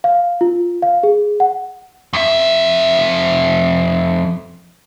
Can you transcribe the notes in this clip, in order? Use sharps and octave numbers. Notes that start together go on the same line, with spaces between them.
F5
F4
F5
G#4
F#5
F2 E5